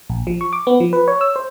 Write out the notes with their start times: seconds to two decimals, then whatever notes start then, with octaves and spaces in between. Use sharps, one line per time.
0.10 A#1
0.27 F3
0.41 C#6
0.53 D6
0.67 B3
0.80 F3
0.93 B4
1.08 C#5
1.21 E6
1.36 C5